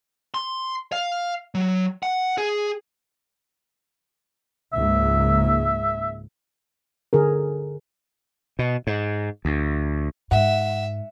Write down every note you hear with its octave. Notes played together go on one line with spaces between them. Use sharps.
C6
F5
F#3
F#5
G#4
C#2 G#2 A#3 E5
D3 G#4 A#4
B2
G#2
D2
G#2 E5 F#5